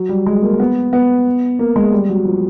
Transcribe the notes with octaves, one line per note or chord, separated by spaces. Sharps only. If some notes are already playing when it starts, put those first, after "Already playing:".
Already playing: F#3
G3
G#3
A#3
B3
B3
A#3
G#3
G3
F#3
F3